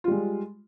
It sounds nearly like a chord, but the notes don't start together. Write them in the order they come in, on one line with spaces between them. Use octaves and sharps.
F4 G3 G#3